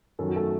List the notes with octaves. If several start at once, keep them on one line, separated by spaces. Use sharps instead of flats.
F#2 D#3 F#3 A4
F#4
A3 A4